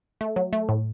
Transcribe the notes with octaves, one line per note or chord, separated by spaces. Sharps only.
A3
F#3
A3
A2